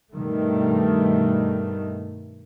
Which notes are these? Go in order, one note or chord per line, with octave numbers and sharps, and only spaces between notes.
G2 B2 D#3 G3 A3